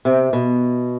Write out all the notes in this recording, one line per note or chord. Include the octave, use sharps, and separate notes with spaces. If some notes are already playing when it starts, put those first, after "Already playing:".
C3
B2